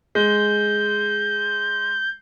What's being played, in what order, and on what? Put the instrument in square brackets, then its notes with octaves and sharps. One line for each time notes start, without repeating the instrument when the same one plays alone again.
[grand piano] G#3 [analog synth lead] G6